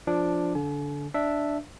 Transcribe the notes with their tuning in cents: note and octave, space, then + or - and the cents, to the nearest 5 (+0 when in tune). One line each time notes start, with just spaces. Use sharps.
F3 +0 D4 +0 D6 +10
D3 -25 G#5 +45
D4 +0 E5 +0